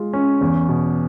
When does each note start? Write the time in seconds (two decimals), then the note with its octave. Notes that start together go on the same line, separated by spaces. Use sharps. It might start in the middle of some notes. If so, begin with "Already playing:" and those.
Already playing: G#3 F4
0.13 C#4
0.41 E2
0.69 B2